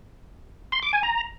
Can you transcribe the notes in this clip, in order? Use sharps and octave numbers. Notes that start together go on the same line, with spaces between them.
C6
D6
G#5
A#5